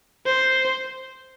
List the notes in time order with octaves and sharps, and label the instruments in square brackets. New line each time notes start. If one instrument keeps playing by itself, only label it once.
[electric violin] C5